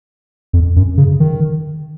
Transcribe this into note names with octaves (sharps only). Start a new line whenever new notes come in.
F2
F#2
C#3
D#3